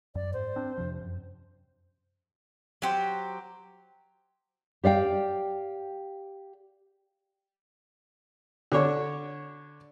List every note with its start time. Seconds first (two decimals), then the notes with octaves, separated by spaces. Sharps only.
0.15 F#2 D5
0.33 G#2 C5
0.56 C4 D4
0.78 F2 C3 F3
1.01 F#2
2.82 F#3 G4 C5
4.84 G4 D5 F5 G5
8.72 D3 D4 C#5